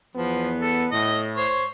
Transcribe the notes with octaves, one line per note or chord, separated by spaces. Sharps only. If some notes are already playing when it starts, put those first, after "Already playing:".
E2 F3 B3
A4
A2 D#5
C5 C#5